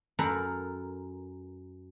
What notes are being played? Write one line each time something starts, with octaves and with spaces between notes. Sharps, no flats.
F#2 A4 A#4 A#5 B5